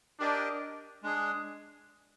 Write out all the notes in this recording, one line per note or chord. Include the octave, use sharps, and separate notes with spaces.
D4 G4 A#4 D#5 G5
G#3 D4 G#4